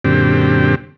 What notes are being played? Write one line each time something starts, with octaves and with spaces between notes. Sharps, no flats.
F#2 A#2 D3 C4 G4